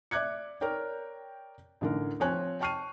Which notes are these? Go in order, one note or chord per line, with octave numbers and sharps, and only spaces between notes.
D5 E5 D6 F#6 G#6 C#7
A#4 C#5 D5 G5
A1 D3 A#4
F3 C4 C#5 G#5 F#6
G5 A5 C#6 F6 C7 D#7